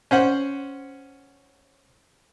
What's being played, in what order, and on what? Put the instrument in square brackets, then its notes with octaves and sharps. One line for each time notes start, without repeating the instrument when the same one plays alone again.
[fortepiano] C#4 C5 F#5